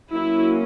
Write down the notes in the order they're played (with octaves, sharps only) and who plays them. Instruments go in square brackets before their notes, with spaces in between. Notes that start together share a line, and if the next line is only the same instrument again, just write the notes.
[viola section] F#3 A#3 C#4 E4